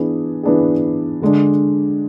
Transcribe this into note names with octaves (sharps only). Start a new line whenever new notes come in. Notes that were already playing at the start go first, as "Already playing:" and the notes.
Already playing: E3 B3 D4 G#4
E3 B3 D4 G#4
D3 G#3 D4